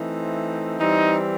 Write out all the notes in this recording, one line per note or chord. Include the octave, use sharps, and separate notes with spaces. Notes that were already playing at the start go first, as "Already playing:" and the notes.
Already playing: E3 A3 C4 D#4
E3 G3 C4 D#4